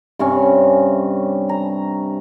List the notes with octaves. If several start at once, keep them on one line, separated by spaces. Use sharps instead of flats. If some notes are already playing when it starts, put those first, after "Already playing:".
G2 C3 C#4
A#5